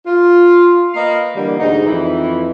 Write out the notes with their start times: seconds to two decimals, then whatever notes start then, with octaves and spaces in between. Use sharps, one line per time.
0.05 F4
0.94 A#3 B4 D#5 F5
1.35 D3 E3 G3 A#3
1.59 D2 G#2 D#4
1.86 F2 E3